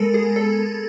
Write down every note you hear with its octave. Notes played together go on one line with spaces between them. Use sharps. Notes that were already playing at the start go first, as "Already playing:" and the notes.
Already playing: G#3 B3 A4 A#4
G#4
A4